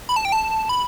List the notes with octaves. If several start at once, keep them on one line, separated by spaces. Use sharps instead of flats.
B5
A5
G5
A5
B5